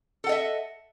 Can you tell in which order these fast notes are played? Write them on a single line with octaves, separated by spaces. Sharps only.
A4 F#5 D#5 E5